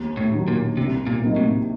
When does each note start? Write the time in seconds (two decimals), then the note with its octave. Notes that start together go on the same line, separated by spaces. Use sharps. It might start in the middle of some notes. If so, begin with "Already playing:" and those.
Already playing: D#2
0.17 A2
0.32 D#3 F#3
0.48 A#2
0.77 C2 C3
1.07 A#2
1.22 C3 F#3 A#3 D#4
1.36 A2